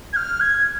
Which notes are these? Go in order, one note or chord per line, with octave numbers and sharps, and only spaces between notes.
G#6
F6
G#6